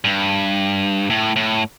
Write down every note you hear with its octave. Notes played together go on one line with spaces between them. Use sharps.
G2
A2
A2